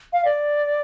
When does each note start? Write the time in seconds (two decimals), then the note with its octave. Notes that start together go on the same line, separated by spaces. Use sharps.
0.13 F5
0.25 D5